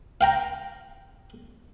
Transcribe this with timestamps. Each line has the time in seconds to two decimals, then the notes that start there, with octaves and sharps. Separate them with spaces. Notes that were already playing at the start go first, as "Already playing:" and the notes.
0.21 F5 G5 A#5